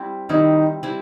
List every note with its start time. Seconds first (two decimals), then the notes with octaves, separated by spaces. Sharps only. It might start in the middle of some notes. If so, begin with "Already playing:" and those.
Already playing: G3 C4 E4
0.29 D#3 G3 C4 D#4 E4
0.83 G3 C4 E4